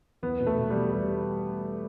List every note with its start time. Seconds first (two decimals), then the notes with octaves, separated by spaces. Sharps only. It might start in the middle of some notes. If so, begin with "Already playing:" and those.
0.23 E2 B3
0.40 B2
0.47 A3
0.59 B2
0.70 G3
0.75 E2
0.93 G3